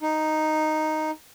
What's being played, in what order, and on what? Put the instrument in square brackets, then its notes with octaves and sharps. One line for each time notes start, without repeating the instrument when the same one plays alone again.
[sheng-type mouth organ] D#4